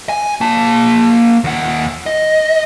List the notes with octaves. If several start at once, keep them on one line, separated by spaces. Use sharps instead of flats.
G#5
A#3 A5
D#2 F#5
D#5